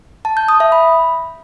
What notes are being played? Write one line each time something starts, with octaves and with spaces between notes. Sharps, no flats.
A5
G6
D#6
E5
B5